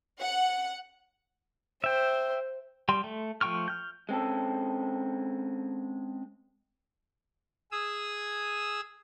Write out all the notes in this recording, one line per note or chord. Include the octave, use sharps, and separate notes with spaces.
F#5
C5 E5 G5
G3 G5 C6
A3
F3 A3 G5 C#6 F6
F6 G6
G#3 C4 C#4 A4
G#4 D#6 E6